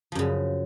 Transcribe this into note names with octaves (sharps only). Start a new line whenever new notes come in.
F#2 C#3 F3